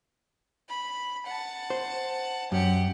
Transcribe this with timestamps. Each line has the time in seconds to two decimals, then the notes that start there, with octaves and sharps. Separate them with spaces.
0.69 B5
1.27 F#5 A5
1.70 C5
2.52 F#2 G4 F#5